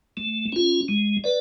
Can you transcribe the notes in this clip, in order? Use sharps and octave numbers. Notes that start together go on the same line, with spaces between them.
A3
C#4 F4
G#3
B4 D5